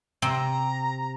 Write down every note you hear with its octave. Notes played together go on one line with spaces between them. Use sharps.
C3 C4 A#5